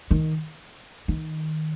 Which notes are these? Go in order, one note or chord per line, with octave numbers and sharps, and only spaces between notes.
D#3
D#3